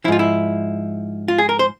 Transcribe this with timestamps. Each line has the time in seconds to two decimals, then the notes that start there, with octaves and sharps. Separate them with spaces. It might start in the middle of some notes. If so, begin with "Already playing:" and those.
0.04 F3 E4
0.08 G#2 F4
0.19 E4
1.28 F4
1.38 G#4
1.49 A#4
1.59 C5